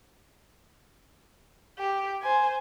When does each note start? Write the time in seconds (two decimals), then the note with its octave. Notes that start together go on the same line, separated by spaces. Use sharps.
1.78 G4
2.22 C5 G#5